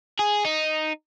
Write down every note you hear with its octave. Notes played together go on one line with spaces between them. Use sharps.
G#4
D#4